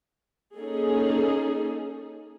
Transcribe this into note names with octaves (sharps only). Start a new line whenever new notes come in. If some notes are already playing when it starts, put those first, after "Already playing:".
A#3 C#4 D#4 G#4 A4